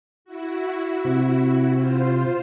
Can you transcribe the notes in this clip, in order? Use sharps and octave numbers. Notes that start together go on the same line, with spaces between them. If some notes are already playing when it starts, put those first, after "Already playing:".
E4 F#4
C3
F4 C5